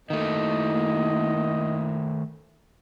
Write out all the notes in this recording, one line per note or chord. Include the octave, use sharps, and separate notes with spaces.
D#3 A3 A#3 E4 D#5